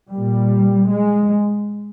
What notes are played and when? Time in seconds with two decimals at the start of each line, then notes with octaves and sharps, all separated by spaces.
0.11 A#2 G3
0.89 G#3